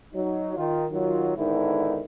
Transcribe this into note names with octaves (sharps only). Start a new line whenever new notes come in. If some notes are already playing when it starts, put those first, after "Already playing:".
F#3 D#4
D#3 F4
D#3 F#3 F4
G#2 D3 D#3 B3 D#4 E4